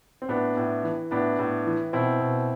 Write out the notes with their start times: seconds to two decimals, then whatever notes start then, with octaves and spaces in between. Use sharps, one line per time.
0.22 C4
0.28 A2 B3 D4
0.57 A2
0.83 E3
1.11 A2 B3 D4
1.39 A2
1.66 E3
1.93 B2 C4 E4
2.20 B2